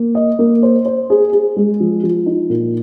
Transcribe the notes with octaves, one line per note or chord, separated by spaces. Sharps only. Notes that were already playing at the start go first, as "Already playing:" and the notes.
Already playing: A#3
D#5
A#3
C5
C5
G#4
G#4
G#3
F3
F3
D#4
A#2